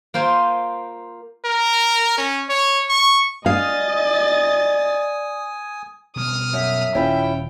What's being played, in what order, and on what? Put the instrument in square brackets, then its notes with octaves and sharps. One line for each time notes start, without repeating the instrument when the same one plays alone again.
[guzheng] A#3 F4 C5 G5 G#5
[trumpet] A#4
C#4
C#5
C#6
[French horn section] D5 [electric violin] D#5 A6 [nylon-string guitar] F5 [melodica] G#5 D#6
[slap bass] B2 G3 [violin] D#6 F6
[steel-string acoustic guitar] F#2 [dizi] E5
[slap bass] D#1 [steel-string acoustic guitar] C#4 E4 F4 [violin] G5